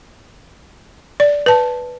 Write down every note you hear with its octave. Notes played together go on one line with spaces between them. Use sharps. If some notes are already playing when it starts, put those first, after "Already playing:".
D5
B4 A5